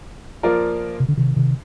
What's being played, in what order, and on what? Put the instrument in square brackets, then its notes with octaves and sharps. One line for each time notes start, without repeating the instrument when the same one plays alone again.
[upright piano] F3 A#3 F4 A#4 D5
[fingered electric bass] C3
D3
C3 D#3
C3 D#3